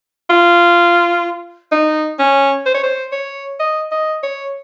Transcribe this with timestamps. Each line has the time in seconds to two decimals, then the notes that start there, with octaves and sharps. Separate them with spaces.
0.30 F4
1.72 D#4
2.19 C#4
2.66 C5
2.74 C#5
2.83 C5
3.12 C#5
3.59 D#5
3.92 D#5
4.23 C#5